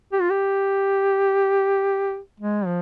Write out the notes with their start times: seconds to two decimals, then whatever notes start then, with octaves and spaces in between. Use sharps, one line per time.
0.13 G4
0.21 F4
0.30 G4
2.40 G#3
2.65 F3